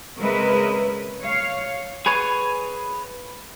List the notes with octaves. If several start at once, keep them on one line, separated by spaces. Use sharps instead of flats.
C#3 G#3 C4 A#4 B4 E5
C#5 F5
G#4 B4 C#5 G#5